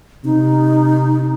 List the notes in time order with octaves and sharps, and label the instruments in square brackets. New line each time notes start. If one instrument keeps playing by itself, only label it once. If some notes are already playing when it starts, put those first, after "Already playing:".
[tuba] C3 [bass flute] D#4